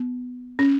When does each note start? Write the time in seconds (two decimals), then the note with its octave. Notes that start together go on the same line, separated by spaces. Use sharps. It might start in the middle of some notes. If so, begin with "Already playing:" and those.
Already playing: B3
0.59 C#4